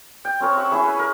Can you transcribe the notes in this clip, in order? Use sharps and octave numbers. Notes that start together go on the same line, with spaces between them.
G5
C4 C#4 A#4 C#5
E5 F#5 C#6
C#4 E4 G#4
B4
A#4